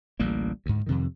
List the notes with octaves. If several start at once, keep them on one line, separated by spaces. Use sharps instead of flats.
A1 D2 G3 A#3
D2 G#2
F2 C3 D#3